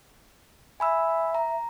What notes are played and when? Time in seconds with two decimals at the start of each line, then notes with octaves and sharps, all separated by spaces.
0.80 E5 G#5 B5 E6
1.35 A#5